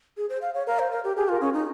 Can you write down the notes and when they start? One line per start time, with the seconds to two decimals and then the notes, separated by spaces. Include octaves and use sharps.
0.17 G#4
0.29 C5
0.42 F5
0.54 C#5
0.67 A#4 F5
0.79 C5
0.91 A#4
1.04 G4
1.17 G4 G#4
1.29 F4 A#4
1.41 C#4 G#4
1.53 D#4